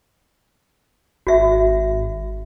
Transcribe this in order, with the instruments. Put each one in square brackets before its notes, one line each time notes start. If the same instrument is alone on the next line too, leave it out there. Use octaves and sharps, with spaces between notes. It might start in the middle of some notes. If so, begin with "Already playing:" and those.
[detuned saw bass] G#1 [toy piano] F#4 E5